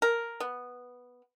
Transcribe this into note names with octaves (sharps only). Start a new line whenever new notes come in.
A#4
B3